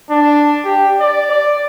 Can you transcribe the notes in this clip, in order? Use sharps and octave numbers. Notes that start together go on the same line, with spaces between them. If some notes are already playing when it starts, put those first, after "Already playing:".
D4
G4
D5
D5